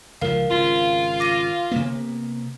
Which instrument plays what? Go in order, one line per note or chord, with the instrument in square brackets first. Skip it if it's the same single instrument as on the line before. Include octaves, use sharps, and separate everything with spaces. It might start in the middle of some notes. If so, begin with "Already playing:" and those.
[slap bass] C#2 G#2 F3 [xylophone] A#4 F5
[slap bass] G#1 C#3 [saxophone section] F4
[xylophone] D6 A#6 D#7
[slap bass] C3 A#3 B3